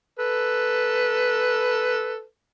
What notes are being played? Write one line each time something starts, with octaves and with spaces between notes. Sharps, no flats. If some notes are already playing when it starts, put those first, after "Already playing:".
A4 B4